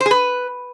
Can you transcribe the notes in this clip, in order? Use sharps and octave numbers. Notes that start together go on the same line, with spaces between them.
C5
G#4
B4